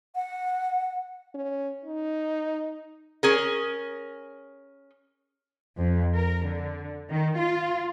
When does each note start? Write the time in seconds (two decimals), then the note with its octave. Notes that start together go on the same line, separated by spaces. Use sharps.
0.15 F#5
1.34 C#4
1.85 D#4
3.23 C#4 G#4 A#4
5.78 F2
6.15 A#4
6.44 D3
7.08 D#3
7.38 F4